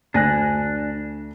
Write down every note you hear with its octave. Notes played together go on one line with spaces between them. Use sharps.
D2 D4 D5 G#5 F#6 A#6